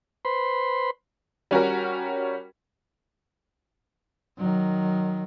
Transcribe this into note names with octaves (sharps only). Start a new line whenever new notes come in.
B4 C5 B5 C6
G3 C#4 F#4 A#4
D#3 F#3